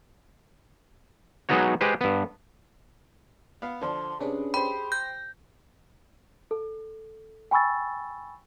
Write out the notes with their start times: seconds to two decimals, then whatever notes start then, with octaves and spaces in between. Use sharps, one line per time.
1.49 F#3 G#3 B3 D#4 F#4 C#5
1.81 G#3 G4 B4 C5
2.01 G2 B3
3.62 B3 F5
3.82 D3 F3 C6
4.20 C3 C#4 D4 G#4 B4
4.54 G4 C5 B5
4.92 G6 A#6
6.51 A4
7.51 G5 G#5 B5 C#6 E6 A6